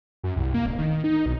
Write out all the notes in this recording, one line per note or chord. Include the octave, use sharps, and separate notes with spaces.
F#2
C2
A#3
D1
D#3
D#4
B1